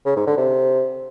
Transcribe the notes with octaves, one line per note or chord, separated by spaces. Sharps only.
C#3
G#2
D3
C3